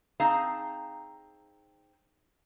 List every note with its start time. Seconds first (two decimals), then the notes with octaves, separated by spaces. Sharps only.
0.20 C4 D#4 G#4 F5 A5 A#5